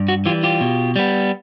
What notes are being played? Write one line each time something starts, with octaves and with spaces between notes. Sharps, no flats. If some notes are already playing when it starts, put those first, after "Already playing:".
Already playing: G2
F#4
E3 G3 F4 G4
F4 G4
B2
G3 B3